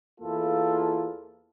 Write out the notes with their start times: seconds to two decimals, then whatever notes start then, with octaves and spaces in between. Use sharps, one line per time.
0.21 E2 A#3 E4 F4 A4